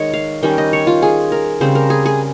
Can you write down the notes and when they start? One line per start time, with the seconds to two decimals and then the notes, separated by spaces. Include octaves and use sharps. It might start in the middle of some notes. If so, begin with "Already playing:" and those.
Already playing: D#3 G#3 C#5 D#5
0.14 F5
0.43 D#3 G3 C#4 G5
0.58 D#5
0.73 C#5
0.87 F4
1.02 G#4
1.32 A#4
1.61 C#3 G3 C4 C5
1.75 A#4
1.90 G#4
2.06 G#4